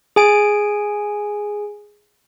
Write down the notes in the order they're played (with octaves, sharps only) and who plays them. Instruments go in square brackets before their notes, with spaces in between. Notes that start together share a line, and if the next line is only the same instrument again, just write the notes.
[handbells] G#4 G#5 D7